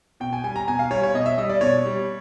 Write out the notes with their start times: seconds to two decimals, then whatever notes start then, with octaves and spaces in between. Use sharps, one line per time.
0.20 B2 G5
0.33 G#5
0.44 G3 G#5
0.56 A#5
0.68 B2 G#5
0.79 F5
0.91 G3 C#5
1.03 C#5
1.14 B2 D#5
1.26 E5
1.38 G3 D#5
1.49 D5
1.61 B2 C#5
1.86 G3